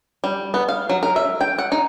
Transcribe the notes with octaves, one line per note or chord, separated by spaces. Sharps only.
G3
B3
F5
F#3
A#4
E5
G5
F#5
D#4